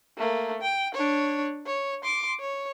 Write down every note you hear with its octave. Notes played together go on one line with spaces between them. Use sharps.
A3 A#3
G5
D4 C#5
C#5
C6 D6
C#5